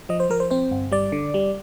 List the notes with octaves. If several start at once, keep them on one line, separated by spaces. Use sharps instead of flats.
F3 D#5
C5
F3 A#4
C5
C4 C5
G1
G3 D5
D3
G3